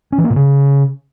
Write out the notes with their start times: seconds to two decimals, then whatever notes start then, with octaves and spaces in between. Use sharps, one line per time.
0.12 C#4
0.18 E3
0.24 A#3
0.30 A#2
0.36 C#3